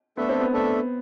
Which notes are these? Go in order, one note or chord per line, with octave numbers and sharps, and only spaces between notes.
A3 B3 D4 A4 E5
C4
B3
A3 D4 A4 E5